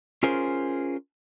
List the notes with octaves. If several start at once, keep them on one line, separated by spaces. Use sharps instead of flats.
C#4 F4 G#4 A#4 C5